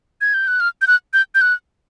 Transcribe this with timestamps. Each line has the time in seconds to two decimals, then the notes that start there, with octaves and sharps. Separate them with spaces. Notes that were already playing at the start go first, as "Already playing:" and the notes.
0.21 G#6
0.34 G6
0.48 F#6
0.60 F6
0.82 G6
0.87 F#6
1.13 G6
1.35 G6
1.41 F#6